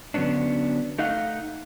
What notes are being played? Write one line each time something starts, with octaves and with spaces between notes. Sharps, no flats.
D3 F#3 B3 C#4 D4
A3 D#4 D#5 F5 F#5